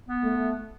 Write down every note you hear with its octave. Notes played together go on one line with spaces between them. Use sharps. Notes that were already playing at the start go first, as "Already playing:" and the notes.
B3
A3